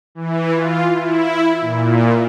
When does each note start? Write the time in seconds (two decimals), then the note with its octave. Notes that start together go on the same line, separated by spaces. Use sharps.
0.15 E3
0.54 F4
0.96 E4
1.61 A#2